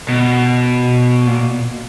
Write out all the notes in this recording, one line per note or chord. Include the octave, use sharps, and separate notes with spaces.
B2
A#2